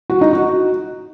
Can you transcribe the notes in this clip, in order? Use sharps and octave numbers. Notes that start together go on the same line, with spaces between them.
F#4
D#4
F#4